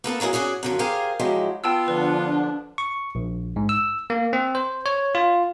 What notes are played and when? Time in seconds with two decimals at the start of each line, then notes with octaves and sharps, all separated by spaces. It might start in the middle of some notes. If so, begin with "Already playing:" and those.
0.04 A#3 B3 A4 A5
0.20 D#3 F#3 A#3 E4 G#4
0.33 C#4 F#4 G#4 D5
0.63 F#2 D3 F3
0.79 G4 G#4 A#4 C5 F5 G#5
1.20 F3 F#3 G#3 E4 G4
1.64 B3 F4 G5 A5 E6
1.88 D3 F3 D4 B4
2.78 C#6
3.15 A#1
3.56 G#2
3.69 E6
4.10 A#3
4.33 C4
4.55 C5
4.86 C#5
5.15 F4